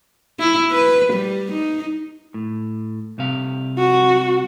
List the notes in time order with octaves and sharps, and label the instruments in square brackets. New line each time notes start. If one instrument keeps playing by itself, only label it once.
[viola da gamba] E4
B4
G3
D#4
[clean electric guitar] A2
C2 C3 F5
[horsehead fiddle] F#4